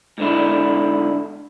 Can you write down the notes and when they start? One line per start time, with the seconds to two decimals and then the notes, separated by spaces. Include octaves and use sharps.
0.18 G#2 D3 E4